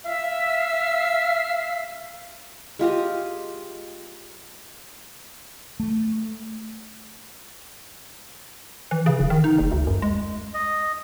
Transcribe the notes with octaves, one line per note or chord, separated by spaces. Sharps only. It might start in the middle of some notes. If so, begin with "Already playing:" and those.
E5 F5 E6
G#3 F4 G4 D#5
A3
E3
C#3
D1
D#3
D#4
F#1
D2
F#2
G#3
D#5